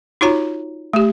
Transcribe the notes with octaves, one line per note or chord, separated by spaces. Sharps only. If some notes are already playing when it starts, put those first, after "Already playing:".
D#4 F4 F#4 C#5 A#5
A3 G4